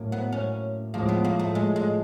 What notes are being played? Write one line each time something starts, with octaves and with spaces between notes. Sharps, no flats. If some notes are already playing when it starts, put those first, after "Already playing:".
Already playing: A2 F#3 A#3 C#4
B3
C#4
A2 F3 G#3 A#3 C#4
B3
A#3
A3
G#3
G#3